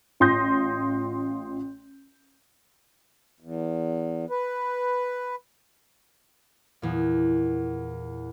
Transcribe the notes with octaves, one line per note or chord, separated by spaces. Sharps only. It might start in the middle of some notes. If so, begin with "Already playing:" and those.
A1 F4 C6 D#6 G6 A#6
E2
B4
E2 A#2